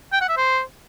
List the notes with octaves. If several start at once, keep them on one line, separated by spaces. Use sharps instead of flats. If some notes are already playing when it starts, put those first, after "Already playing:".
G5
F#5
E5
C5